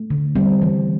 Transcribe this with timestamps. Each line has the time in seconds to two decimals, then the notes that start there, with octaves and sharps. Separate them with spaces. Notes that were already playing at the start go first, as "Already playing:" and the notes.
Already playing: A3
0.10 D3
0.36 G3 C4
0.62 E3